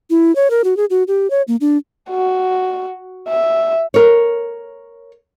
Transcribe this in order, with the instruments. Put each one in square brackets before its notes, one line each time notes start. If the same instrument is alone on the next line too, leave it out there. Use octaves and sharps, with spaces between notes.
[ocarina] E4
C#5
A#4
F#4
G#4
F#4
G4
C#5
A#3
D4
[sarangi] F#4
E5
[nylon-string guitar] A#4 C#5